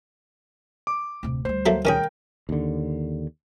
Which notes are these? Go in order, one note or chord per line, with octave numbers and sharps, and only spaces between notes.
D6
D1 C3
D2 G3 C5
F#3 A3 A#3
D#3 C#4 G#4 A#4 G5
D#2 D3